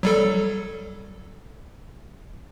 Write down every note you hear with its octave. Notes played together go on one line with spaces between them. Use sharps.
F#3 G3 A4